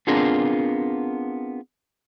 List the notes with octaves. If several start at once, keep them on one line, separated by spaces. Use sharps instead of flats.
B3 C4 D4 F4 G#4 A#4